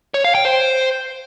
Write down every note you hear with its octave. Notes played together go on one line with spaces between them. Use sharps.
C#5
F5
G5
C5